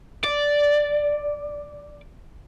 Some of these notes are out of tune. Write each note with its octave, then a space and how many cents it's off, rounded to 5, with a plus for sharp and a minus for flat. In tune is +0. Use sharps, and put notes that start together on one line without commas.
D5 -5